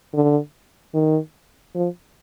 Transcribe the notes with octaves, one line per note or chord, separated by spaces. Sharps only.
D3
D#3
F3